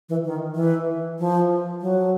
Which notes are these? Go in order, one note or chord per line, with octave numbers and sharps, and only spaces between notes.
E3
D#3
E3
F3
F#3